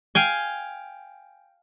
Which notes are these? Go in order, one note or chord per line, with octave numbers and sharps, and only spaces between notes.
F5 G5 G#5